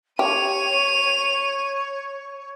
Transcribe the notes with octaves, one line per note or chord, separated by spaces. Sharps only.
G4 C#5 D#7 F7